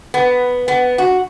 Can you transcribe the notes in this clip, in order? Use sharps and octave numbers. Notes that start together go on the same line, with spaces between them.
B3
B3
F#4